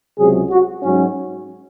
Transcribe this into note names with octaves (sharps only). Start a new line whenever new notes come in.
C#2 C3 F#3 G#4
F#4
G#2 F#3 C#4